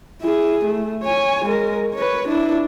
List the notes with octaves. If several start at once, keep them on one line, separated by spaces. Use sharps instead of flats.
E4 G#4
A3
C#5 G#5
G#3 A#4
B4 C#5
D4 E4